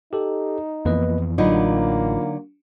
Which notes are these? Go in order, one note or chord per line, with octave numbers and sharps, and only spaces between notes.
D#4 G4 A4
F2 E3 A#3 B3 B4 D#5
A1 D3 F#3 A#3 D#4 F4 B5